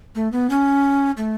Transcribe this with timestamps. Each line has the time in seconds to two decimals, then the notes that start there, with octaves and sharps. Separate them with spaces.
0.15 A3
0.32 B3
0.50 C#4
1.17 A3